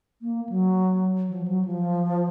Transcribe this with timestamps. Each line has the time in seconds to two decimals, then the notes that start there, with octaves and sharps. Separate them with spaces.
0.22 A#3
0.49 F#3
1.29 F3
1.48 F#3
1.65 F3